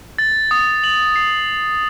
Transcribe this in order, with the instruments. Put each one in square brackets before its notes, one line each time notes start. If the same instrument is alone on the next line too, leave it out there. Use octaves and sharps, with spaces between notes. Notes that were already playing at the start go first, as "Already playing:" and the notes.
[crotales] A6
D#6
F#7
C7